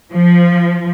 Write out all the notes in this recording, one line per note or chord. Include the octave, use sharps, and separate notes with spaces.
F3